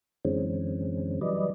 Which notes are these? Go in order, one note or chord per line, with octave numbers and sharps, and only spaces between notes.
F#2 D3 E3 G#3 C4 C#4
E3 F#3 G3 B4 D5 D#5